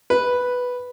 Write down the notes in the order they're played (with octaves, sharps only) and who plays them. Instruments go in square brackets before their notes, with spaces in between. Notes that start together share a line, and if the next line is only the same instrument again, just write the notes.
[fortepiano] B4